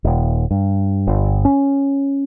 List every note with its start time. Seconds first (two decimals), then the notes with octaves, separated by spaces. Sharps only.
0.04 D#1
0.51 G2
1.07 G1
1.45 C#4